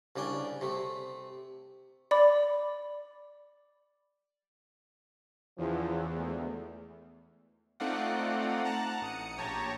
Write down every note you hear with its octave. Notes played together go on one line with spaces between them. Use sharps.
C2 C#3 D4 G5 G#5
C3 A3
D5 B5 D6
E2 C#3 F3
D2 G#3 A3
A3 C4 D#4 F4 D5 F#5
F#5 A5 A#5 F#6
A1 D#6 C#7
A#1 G4 C#5 A5 A#5